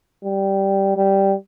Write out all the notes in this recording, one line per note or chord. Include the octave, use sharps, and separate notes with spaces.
G3
G3